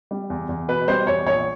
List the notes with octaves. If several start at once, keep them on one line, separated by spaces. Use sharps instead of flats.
G3
E2
E2
B2 B4
G3 C5
E2 C#5
A#1 C#5